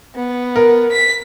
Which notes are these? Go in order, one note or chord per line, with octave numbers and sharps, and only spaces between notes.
B3
A#4
B6